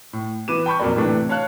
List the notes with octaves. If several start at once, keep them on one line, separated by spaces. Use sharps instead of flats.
A2
E3 B3 B4 D6 D#7 E7
G5 A5 B5 C#6 G6
F2 A#2 F#3 A#3 D5
A2 C3 E3 A3 D4
C#5 F5 A5 F#6